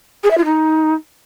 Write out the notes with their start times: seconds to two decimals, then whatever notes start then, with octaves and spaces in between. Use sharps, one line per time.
0.24 G#4
0.31 E5
0.38 F4
0.45 D#4